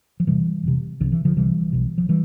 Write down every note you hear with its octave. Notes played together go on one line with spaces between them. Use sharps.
F3
E1 E2 C3 E3 G3
E1 E2 C3
C2 C3 D3 F3
E3
D3 F3
C2 C3 E3 G3
B1 B2
F3
E3 G3